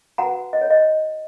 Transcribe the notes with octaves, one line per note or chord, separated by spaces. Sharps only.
F#4 B4 F#5 A#5
D#5
C#5
D#5